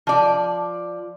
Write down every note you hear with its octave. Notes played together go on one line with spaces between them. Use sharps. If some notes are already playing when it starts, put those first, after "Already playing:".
F3 D5